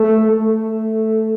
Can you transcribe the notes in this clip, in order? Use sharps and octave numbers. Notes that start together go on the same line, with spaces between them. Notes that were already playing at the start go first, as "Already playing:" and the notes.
Already playing: A3
A3